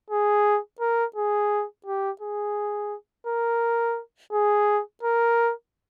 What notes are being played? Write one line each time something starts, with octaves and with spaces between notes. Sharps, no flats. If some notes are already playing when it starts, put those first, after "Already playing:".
G#4
A#4
G#4
G4
G#4
A#4
G#4
A#4